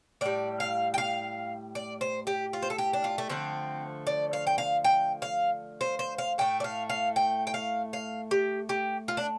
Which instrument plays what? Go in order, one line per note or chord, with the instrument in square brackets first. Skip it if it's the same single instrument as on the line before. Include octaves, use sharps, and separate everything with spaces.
[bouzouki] A2 G3 D5
F5
G5
F5
D5
C5
G4
F4
C5
A4
G4
D4
F4
A3
D3 F3 A3 C4
D5
F5
G5
F5
G5
F5
C5
C5
F5
A2 A3 G5
D5
F5
F5
G5
G5
F5
F5
G4
G4
F4
D4